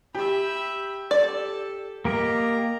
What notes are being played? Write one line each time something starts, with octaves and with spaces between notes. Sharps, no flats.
G4 E5 B5
A4 D5
A#3 G4 A#4 D#5 A#5